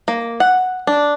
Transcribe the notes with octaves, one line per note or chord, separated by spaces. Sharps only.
A#3
F#5
D4